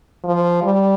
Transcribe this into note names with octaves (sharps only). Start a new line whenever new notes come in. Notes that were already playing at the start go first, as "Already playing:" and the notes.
F3
G3